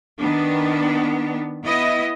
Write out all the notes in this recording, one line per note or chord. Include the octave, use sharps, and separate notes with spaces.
D#3 B3 D4
B3 E4 D#5